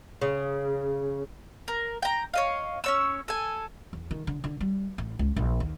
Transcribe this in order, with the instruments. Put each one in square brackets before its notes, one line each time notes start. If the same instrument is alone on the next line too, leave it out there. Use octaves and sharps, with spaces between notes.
[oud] C#3
[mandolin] A#4
G5 A#5
C#5 D#5 F5
C#4 C#5 E6
A4 G#5
[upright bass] E2
D#3
D3
D3
G3
A1
C#2
A#1
D#2